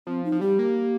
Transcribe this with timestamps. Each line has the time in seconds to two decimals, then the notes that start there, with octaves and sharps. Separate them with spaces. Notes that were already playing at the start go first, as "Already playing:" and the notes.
0.07 F3 C4
0.25 D#4
0.32 F3
0.41 G3 G4
0.59 A#3